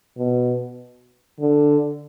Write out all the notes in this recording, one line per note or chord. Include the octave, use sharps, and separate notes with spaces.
B2
D3